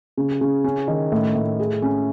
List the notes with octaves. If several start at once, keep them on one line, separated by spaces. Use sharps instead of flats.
C#3
C#3
C#4
D#3
A2
A2
G#4
C#4